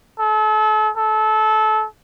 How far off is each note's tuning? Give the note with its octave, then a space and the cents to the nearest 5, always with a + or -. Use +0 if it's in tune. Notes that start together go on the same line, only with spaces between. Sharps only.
A4 -35
A4 -25